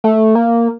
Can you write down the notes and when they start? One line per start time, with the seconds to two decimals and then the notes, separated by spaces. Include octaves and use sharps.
0.04 A3
0.35 A#3